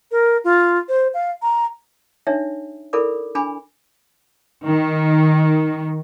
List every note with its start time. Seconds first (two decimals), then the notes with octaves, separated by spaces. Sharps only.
0.11 A#4
0.44 F4
0.89 C5
1.14 F5
1.42 A#5
2.27 D4 D#4 C#5 E5
2.93 E4 A4 A#4 D5 B5 D6
3.35 D4 G#5 B5 D6
4.65 D#3